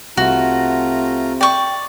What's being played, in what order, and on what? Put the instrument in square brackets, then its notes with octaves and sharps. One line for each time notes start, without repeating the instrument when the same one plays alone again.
[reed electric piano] C2 [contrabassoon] C3 [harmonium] A3 F4 A#5 [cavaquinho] F#4
[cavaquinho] D5 C#6 [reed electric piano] G5